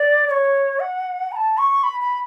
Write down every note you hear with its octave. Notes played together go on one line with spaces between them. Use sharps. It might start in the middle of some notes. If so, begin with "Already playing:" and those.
Already playing: D5
D5
C#5
F#5
B5
A5
C#6
B5
B5